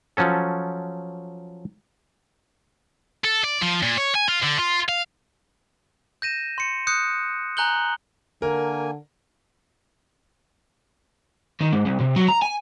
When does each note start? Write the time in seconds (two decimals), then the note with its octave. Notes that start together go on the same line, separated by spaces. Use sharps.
0.17 F3 F#3 C#4 A4
3.24 A4
3.44 D5
3.62 F3
3.83 A#2
3.97 C#5
4.15 G#5
4.28 F4
4.43 D3
4.59 F4
4.89 F5
6.22 G6 A#6 D#7 E7
6.58 C6 C#7
6.87 D#6 F#6 G6 C#7
7.57 G#5 A#5 F#6 G6 F#7 G7
8.42 D3 A#3 A#4 G#5
11.61 D#3
11.73 G#2
11.86 C2
12.01 C3
12.16 F#3
12.28 A#5
12.42 G#5